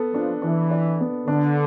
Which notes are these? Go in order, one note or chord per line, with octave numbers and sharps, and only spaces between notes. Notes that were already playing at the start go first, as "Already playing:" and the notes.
Already playing: B3 A4
F3 D4
E3 D4
D5
B3
D3 D4